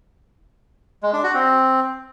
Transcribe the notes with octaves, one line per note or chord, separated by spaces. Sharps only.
G#3
D4
F#4
C4